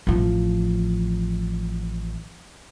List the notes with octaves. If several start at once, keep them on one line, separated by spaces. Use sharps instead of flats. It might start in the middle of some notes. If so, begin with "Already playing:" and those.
A1 F3